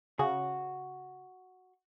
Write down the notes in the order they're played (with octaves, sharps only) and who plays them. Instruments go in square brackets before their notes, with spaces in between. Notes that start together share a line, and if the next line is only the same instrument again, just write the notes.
[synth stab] C#3 [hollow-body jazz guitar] F#4